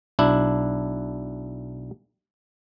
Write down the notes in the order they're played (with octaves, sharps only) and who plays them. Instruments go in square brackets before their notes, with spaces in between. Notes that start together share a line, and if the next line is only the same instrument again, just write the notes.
[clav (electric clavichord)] B1 D4 E4